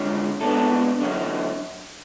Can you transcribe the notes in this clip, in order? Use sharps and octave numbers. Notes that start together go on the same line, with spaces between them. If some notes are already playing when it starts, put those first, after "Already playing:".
Already playing: D3 G#3 C#4
B2 G#3 B3 D4 A4
D3 F#3 C#4